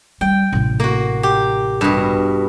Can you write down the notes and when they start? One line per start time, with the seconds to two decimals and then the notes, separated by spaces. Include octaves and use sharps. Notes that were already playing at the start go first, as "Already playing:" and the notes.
0.21 G3 G5
0.53 A1 C3
0.80 A#3 F#4
1.23 G4
1.81 G2 B2